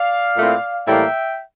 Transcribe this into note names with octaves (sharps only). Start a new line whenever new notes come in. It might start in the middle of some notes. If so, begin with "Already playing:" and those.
Already playing: D5 F5
A#2 A3 C4 E4
A2 E3 G3 A#3 E5 G5